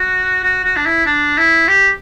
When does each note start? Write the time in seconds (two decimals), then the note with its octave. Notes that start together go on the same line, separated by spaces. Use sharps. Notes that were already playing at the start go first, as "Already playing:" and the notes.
Already playing: F#4
0.44 F#4
0.65 F#4
0.77 D4
0.86 E4
1.06 D4
1.38 E4
1.68 G4